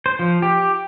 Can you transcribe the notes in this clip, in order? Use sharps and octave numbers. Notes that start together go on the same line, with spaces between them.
C5
F3
G4